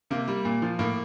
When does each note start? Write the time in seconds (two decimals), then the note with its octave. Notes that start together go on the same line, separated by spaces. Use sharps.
0.10 C3 A#3
0.28 G3
0.45 A#2
0.62 F3
0.79 A2 A#3